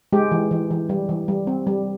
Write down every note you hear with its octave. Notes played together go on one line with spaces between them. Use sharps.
G#3 G4
E3
E3
E3
G3
E3
G3
C4
G3